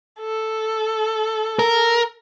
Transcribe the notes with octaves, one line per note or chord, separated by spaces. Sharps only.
A4
A#4